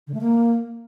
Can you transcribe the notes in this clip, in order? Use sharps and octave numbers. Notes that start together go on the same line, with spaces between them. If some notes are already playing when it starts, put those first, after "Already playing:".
D3
A3
A#3